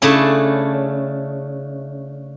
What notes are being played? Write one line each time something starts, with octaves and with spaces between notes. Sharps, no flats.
C#3 A3 D4 E4 A4